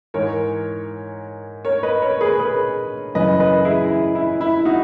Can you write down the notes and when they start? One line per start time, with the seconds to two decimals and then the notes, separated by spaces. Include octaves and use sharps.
0.14 G#2 E3 A#4 C#5
1.65 A#4 C#5
1.83 B4 D#5
2.02 A#4 C#5
2.21 G#4 B4
2.40 G#4 B4
3.15 F#2 C#3 E3 B4 D#5
3.40 B4 D#5
3.65 E4 G#4
3.90 E4
4.15 E4
4.41 E4
4.65 D#4 F#4